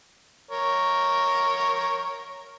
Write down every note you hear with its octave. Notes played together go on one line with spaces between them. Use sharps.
A#4 C#5